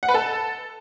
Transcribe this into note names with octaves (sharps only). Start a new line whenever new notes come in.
F#5
B4
A4